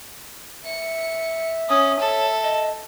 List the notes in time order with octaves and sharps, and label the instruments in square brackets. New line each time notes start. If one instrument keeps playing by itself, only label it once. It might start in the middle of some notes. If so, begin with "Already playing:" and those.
[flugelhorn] E5 [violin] C#7
[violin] C#4 [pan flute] D#6
[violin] A4 [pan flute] C#5
[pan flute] D#5